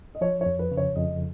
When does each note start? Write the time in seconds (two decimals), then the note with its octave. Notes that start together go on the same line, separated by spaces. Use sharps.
0.15 D#5
0.21 F3 C#5
0.41 C#5
0.46 F2
0.59 B4
0.71 C#3
0.77 C#5
0.96 F2 D#5